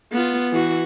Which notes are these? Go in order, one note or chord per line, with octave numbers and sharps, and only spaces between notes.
B3 F4
E3 F#4